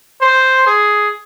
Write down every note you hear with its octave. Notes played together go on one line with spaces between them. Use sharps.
C5
G#4